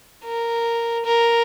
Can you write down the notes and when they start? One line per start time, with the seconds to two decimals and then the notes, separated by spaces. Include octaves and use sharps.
0.23 A#4
1.05 A#4